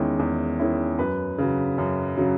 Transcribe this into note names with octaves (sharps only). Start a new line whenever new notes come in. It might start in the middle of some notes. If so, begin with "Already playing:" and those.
Already playing: E2 D#3 G#3 C#4 E4
E2
D#3 G#3 C#4 E4
F#2 B4
C#3 F#3
F#2
C#3 F#3